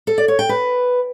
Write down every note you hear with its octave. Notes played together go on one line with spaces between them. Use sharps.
A4
D5
C#5
G5
B4